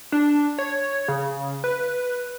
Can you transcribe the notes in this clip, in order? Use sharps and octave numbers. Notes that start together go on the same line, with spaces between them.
D4
C#5
C#3
B4